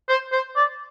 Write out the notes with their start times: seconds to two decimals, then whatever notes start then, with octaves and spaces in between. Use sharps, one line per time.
0.09 C5
0.32 C5
0.56 D5